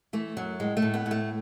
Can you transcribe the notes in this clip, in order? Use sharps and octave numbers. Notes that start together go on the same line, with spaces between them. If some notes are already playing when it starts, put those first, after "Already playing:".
E3 A3
F#2 F#3
A2 G#3
A3
A2
B3
A2
A3